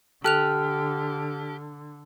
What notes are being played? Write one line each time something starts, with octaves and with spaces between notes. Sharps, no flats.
D3 G4 A4 A5 F6 F#6 F7